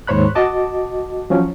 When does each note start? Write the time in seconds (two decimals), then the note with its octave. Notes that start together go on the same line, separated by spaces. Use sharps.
0.07 D#2 G#2 C5 C#5 B5 F#6
0.35 F#4 D#5 A5 D6
1.30 F3 F#3 C#4